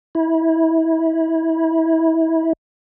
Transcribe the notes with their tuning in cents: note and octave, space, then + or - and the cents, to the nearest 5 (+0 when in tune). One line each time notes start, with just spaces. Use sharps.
E4 -25